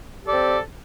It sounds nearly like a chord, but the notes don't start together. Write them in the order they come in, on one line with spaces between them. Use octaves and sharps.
G4 A4 D5 C4